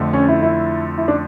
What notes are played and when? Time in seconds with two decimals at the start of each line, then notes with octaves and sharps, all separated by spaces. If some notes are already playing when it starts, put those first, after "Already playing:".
Already playing: F2 D3 A3
0.13 C#4
0.28 E4
0.42 E4
0.98 E4
1.08 D4